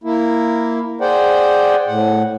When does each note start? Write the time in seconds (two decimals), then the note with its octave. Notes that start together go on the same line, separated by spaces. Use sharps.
0.04 A#3 E4
1.01 G#4 C5 D5 F#5 G5
1.87 A2 F#5